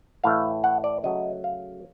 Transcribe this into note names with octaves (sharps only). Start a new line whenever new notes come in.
A2 E3 A3 F5
F#5
D5
C#3 F#3 A3 D#5
F5